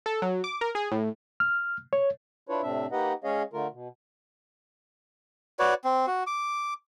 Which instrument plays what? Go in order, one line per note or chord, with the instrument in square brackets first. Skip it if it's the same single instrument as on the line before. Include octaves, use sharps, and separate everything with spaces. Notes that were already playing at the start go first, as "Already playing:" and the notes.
[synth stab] A4
F#3
D6
A#4
G#4
A2
[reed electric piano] F6
C#5
[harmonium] D4 E4 F4 B4 C#5
A2 C3 C4 D4 E5
A#3 D#4 G4 B4 D#5 F#5
G#3 C#4 G#4 C#5 D#5 F5
D3 A3 F4 A#4
B2
[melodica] F#4 B4 C#5 D5
C4
F#4
D6